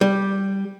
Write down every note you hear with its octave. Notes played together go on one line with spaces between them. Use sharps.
G3